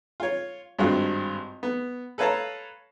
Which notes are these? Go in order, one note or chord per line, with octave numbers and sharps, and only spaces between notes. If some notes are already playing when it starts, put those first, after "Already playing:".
F4 C#5
G#1 G2 C4 F4 F#4 F#6
B3
A4 B4 C#5 F5 A5 A#5